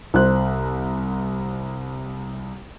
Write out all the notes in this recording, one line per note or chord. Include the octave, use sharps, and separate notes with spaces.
C2 C5 F#6